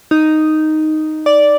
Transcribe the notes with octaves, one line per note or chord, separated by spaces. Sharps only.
D#4
D5